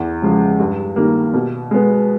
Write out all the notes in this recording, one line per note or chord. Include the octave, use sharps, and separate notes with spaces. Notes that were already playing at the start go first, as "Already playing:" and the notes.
Already playing: E2
C#3 F3 G#3
G2
D#3 G3 A#3
B2
G#3 B3